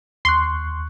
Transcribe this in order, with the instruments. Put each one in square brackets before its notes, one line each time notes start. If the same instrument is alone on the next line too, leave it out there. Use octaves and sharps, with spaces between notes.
[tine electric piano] D#2 C#6 F#6 [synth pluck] C6